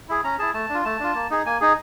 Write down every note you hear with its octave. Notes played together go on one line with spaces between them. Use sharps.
E4 G#4
C#4 A#5
E4 G#4 A5
A3 A5
D4 F4
A3 A5
D4 F4
A#3
D#4 G#4
A#3 G#5
D#4 G#4